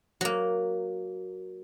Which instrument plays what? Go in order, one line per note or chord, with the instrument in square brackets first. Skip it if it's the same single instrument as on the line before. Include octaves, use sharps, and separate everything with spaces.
[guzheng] F#3 A#3